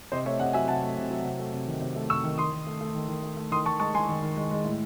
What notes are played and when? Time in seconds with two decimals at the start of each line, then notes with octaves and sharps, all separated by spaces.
0.12 C3 C5 D#5
0.25 A3 C#5 E5
0.40 C3 D#5 F#5
0.53 F#3 E5 G#5
0.68 C3 F#5 A5
0.83 A3
0.97 C3
1.11 F#3
1.24 C3
1.39 A3
1.53 C3
1.67 D#3
1.82 C3
1.96 A3
2.10 C3 C#6 E6
2.23 D#3
2.38 D#3 C6 D#6
2.52 D#3
2.67 A3
2.81 A3
2.95 D#3
3.09 D#3
3.23 A3
3.37 A3
3.51 D#3 C6 D#6
3.66 D#3 A5 C#6
3.79 G#3 A5 C#6
3.94 G#3 G#5 C6
4.09 D#3
4.22 D#3
4.36 G#3
4.51 G#3
4.65 A2